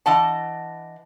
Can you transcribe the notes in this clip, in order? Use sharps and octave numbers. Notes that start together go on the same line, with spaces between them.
E3 D4 D#5 F#5 A5